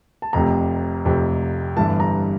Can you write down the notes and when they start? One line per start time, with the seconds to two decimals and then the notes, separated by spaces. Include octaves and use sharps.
0.22 A5
0.33 F1 F2 C3 A#5
1.05 F1 F2 C3
1.77 G1 G2 E3 A5
2.00 A#5